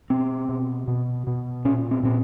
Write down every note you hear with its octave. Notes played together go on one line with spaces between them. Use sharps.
B2 C4
B2
B2
B2
A#2 C#4
C4
A#2 C4